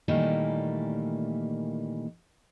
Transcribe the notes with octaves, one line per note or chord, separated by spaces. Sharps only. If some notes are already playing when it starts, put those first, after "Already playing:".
A#2 D#3 E3 G3 A3 A#3